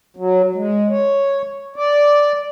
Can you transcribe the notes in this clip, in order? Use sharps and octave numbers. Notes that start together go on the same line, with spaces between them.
F#3
G#3
C#5
D5